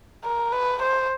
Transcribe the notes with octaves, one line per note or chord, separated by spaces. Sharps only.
A#4
B4
C5